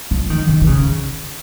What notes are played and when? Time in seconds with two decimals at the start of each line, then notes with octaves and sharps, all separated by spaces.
0.11 F3
0.30 D#3
0.48 D#3
0.62 D#3
0.67 C#3